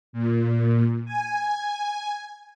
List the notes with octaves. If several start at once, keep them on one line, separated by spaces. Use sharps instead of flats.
A#2
G#5